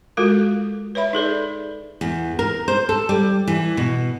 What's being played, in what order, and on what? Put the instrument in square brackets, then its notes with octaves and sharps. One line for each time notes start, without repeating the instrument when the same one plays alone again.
[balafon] G#3 F4 F#4 A4 A#4
B4 C#5 E5 B5
D#4 G#4 A4 D5
[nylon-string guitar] E2
A#4
C5
A4
G3
E3
B2